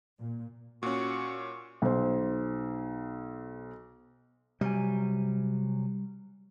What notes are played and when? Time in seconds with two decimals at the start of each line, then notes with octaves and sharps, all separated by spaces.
0.18 A#2
0.83 A#2 C#4 F#4
1.82 B1 C5
4.61 C3 F#3 G3 G#5